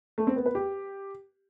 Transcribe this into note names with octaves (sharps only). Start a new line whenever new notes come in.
A3
C4
B3
B4
G4